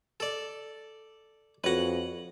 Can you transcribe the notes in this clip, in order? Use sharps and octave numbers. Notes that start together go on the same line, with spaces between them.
A4 D5
F2 F#4 B4 C#5 F#5